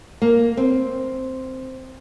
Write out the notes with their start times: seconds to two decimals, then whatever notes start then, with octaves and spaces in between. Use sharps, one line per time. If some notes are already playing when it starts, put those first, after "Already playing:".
0.22 A#3
0.57 C4